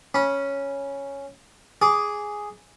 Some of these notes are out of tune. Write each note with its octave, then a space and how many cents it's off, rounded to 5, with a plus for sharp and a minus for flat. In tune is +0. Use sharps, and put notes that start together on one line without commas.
C#4 +0 B5 -25
G#4 +0 D6 -10